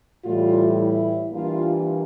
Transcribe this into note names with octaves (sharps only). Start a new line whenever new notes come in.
A2 E3 G3 F4
E4
E3 G3 A#3 D4 F4